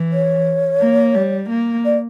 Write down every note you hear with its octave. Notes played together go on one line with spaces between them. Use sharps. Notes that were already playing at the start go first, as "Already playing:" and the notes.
Already playing: E3
C#5
A#3
G3
A#3
D5